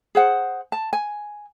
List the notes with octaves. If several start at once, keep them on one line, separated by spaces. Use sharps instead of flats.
G#4 C5 F#5
A5
G#5